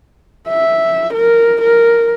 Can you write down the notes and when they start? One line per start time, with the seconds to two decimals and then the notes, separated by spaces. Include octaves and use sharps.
0.49 E5
1.14 A#4
1.62 A#4